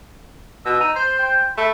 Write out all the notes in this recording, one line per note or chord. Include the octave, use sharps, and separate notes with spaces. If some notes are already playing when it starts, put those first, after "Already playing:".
B2 E6
D#4
C5 C6
G5
A3 B5